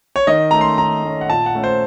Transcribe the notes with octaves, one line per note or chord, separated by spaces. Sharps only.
C#5
D#3 D#5
A3 C#4 A#5
C6
D#3 A#5
A3 C#4
F#5
A#2 A5
F#5
A3 C#4
C5